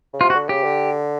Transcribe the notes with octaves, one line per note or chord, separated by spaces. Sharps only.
C#3
C3 F4
F#4
D3
C#3 G4
D3